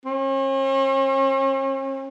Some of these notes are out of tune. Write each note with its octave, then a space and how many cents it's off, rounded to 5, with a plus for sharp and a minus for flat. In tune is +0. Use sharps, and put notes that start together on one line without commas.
C#4 -45